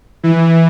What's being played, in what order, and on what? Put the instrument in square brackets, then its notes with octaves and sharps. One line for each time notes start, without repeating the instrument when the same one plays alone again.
[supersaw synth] E3